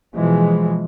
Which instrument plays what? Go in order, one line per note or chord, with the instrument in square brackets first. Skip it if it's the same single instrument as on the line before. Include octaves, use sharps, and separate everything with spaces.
[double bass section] B2 E3 F3 G#3